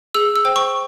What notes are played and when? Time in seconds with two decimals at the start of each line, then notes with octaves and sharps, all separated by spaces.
0.14 G#4 E6
0.36 E6
0.45 C5 G5
0.56 C#6